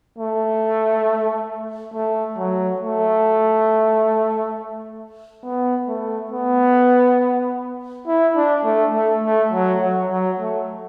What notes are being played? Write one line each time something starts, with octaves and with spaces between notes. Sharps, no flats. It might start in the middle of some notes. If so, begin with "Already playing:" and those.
A3
A3
F#3
A3
B3
A3
B3
E4
D4
A3
A3
A3
F#3
F#3
F#3
A3